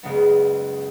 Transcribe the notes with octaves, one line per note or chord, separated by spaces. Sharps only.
F#1 C#2 B3